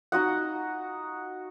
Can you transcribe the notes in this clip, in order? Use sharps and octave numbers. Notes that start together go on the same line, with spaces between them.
D#4 F#4 D#5 F#5